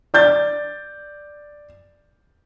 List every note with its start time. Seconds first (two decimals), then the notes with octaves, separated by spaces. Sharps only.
0.14 D5 G6 A6